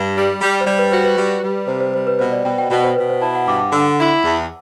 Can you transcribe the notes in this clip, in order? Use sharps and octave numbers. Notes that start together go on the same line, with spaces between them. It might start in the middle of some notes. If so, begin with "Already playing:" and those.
Already playing: G2
G3
G3
C5
G3 D5
B4
F#4 C5
B4
G3
G3
C3 C5
C5
G3 C5
B4
B2 C5
D5
B2 G5
G5
B2 B4
C5
B2 B4
C5
E4 A5
F#5
G2 D6
D6
D3 E6
E4
E2